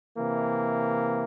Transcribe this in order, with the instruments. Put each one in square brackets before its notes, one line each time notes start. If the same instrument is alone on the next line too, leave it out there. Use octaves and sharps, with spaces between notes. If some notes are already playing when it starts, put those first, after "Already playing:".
[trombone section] C3 E3 A#3